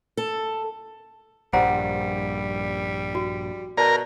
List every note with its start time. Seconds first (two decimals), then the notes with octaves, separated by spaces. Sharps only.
0.17 A4
1.53 A#1 G2 G3 C5 F#5 A#5
3.15 F#4
3.78 B2 A#4 D5 A5